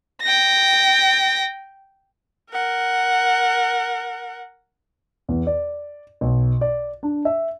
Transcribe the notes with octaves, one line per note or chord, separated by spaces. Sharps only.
G5 A#6
A#4 F#5
E2
D5
B1
D5
D4
E5